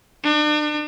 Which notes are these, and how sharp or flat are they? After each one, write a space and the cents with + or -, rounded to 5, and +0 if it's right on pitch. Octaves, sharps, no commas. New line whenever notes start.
D4 +40